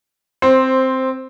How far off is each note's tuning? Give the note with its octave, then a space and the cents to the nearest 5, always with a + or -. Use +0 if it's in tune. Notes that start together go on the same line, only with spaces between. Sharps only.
C4 +0 C5 +10